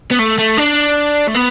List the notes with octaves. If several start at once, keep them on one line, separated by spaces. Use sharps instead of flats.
B3
A3
A3
D4
A3
B3